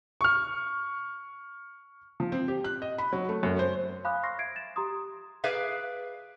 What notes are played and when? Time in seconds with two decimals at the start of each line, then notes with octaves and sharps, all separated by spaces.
0.21 C#6 F6
2.20 F3
2.32 C4
2.48 G4
2.64 F#6
2.82 D#5
2.98 B5
3.13 F#3
3.29 A3
3.43 F#2
3.59 C5
4.05 F5 G#5 B5 D6 D#6 F#6
4.23 C6 C#6 F6 A#6 C7
4.38 E5 G#6 C7 D7
4.56 A6 E7
4.76 G4 A#5 C6 D#6
5.44 G#4 B4 D5 E5 F5